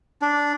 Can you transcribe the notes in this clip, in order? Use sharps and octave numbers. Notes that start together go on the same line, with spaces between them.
D4